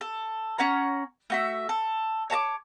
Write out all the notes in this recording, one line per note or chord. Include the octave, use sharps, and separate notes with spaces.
A4
C#4 C#5 F#5 A#5
A3 F#4 E5
A4
C#5 A5 A#5 D6